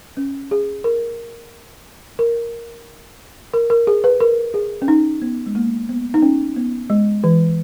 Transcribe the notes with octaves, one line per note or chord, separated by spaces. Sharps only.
C#4
G#4
A#4
A#4
A#4
A#4
G#4
B4
A#4
G#4
C#4
D#4
B3
G#3
A#3
B3
D#4
C#4
B3
G#3
E3